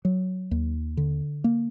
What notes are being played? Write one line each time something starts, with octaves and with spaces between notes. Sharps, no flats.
F#3
D#2
D3
A#3